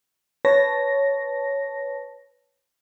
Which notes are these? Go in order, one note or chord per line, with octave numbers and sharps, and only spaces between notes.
B4 C#5 A5 A#6